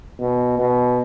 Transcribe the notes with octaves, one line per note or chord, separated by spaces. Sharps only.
B2
B2